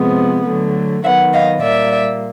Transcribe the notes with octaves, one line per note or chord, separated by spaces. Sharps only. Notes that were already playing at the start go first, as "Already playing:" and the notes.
Already playing: C3 F3 G#3 B3
D3 F#3 A3
D#3 F#3 B3 E5 F#5
D#5 F5
A#2 G3 A#3 D5 E5